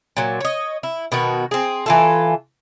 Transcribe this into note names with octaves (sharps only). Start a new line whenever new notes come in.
A#2 F#3
C#5 D#5
E4
B2 D#3 F#4
C4 G#4
E3 F4 A4